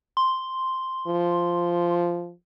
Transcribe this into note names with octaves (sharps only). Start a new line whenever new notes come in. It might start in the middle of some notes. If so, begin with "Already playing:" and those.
C6
F3